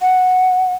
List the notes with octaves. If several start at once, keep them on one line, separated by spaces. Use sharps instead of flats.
F#5